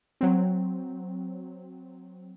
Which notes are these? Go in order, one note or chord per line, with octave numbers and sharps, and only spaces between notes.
F#3 C4